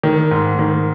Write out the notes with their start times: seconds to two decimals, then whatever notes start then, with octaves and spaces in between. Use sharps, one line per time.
0.04 D#3
0.31 G#2
0.59 D#3